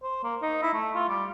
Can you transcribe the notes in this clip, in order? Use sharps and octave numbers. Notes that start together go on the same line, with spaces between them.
C5
A#3
D#4
E4
A3
F4
G3